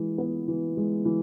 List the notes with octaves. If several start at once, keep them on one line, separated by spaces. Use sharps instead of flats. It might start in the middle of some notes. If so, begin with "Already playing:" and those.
Already playing: E3 G#3
B3
E3
G#3
E3